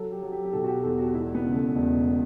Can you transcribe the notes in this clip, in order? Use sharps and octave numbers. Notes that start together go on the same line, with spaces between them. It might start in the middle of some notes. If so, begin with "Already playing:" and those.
Already playing: F#3 A4
G4
F#3
G4
G4
B2 A4
F#4
G4
E2 A4
F#4
E1 E4
B3
C#3
A3
E1